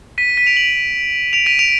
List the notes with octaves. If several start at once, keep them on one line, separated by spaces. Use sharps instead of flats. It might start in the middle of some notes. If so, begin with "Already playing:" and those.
B6 D#7
B6 D#7
D7 F7
D#7 F#7
D7 F7
B6 D#7
D7 F7